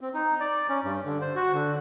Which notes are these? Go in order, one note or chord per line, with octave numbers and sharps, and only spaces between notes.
C4
D#4
D5
C#4
G2
D3
C5
F#4
D3